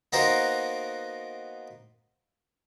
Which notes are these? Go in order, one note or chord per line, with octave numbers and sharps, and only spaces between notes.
A#3 B3 D#4 F#4 A#4 C5